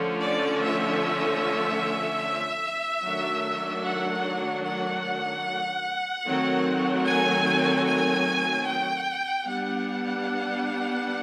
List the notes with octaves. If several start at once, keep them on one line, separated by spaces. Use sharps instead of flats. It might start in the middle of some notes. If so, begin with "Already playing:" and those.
Already playing: D3 F3 A3 C#4
D5
E5
D#3 F#3 A3 D4
F#5
F#5
D#3 F#3 A3 C4
G#5
G#5
G5
G3 B3 D4 F#5